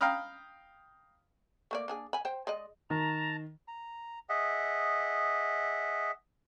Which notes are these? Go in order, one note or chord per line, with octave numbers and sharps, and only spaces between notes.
F5 G5 A#5 B5 D#6 F6
A3 A#3 D5
A#3 D4 G#4
G#5 B5
C5 G5
G#3 D5 D#5
D#3 A5 A#5
A#5
G#4 D#5 E5 F#5